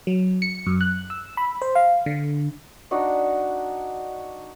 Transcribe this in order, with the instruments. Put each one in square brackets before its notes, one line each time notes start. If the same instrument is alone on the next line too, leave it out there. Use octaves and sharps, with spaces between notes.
[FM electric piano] F#3
C#7
F#2
F#6
E6
B5
C5
F5
D3
[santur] D4 D#4 F#4